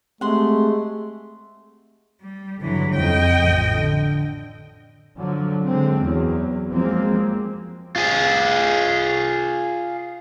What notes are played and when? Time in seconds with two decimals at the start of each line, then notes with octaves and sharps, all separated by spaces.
0.21 G#3 A3 C4 G4 G#4 F#5 C6
2.22 G3
2.62 G2 D3 E3 F#3
2.96 F2 C#3 D#5 G5
3.37 A1 F3
3.74 D3
5.18 D3 F3 F#3
5.65 D3 G#3 C4
6.02 E2 F#3
6.73 F3 F#3 G#3 A#3 C4
7.96 F4 G#4